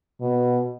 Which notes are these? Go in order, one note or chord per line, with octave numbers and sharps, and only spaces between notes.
B2